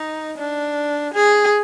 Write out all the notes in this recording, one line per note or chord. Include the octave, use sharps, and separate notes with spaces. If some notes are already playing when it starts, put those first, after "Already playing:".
Already playing: D#4
D4
G#4